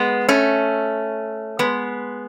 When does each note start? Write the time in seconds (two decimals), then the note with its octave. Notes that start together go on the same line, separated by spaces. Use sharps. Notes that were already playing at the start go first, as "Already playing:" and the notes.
Already playing: G#3 B3
0.29 A3 C#4
1.59 G#3 B3